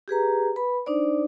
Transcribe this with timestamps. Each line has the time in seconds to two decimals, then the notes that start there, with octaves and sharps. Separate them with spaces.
0.08 G4 G#4 B4 A#5
0.56 B4 B5
0.86 D4 D#4 C5 D5